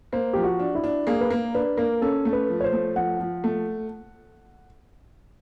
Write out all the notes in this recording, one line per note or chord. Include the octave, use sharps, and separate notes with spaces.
A#3 C5
F3 G4
F#4
D4
E4
D4
A#3 G#4
B4
A#3 A#4
D4 B4
A#3 A#4
C#4 A4
A3
B4
F3
C#5
C5
A3
F3 F#5
F3
A3